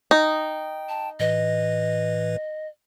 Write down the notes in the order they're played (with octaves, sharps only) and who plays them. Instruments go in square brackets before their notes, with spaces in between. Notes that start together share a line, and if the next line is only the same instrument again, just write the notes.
[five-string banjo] D#4 [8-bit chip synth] G5
[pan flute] A5
[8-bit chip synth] A2 E3 B4 [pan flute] D#5